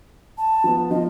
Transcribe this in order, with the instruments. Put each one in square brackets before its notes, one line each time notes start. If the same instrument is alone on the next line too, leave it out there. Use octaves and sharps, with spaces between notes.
[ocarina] A5
[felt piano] F3 B3
[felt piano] F3 F4 [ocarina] D#5